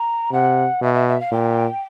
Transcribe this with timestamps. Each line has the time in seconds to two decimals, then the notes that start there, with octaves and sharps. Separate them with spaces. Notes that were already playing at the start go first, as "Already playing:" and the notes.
Already playing: A#5
0.31 C3 F#5
0.82 B2 E5
0.94 E5
1.07 E5
1.20 F5
1.32 A#2 G5